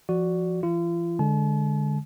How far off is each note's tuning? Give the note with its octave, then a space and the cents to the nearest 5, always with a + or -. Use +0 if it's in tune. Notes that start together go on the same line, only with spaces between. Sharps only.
F3 -20 F#4 +0 D5 +0
E3 +35 F4 -40
D3 +0 G#3 +0 A5 -45